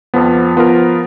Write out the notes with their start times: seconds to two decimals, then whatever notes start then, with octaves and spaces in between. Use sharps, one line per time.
0.14 F2 F3 B3
0.56 F3 B3 F4 A#4